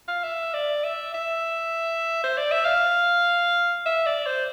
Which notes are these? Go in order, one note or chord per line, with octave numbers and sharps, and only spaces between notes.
F5
E5
D5
E5
E5
C5
D5
E5
F5
E5
D5
C5